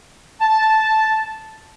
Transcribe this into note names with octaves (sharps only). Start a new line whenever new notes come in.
A5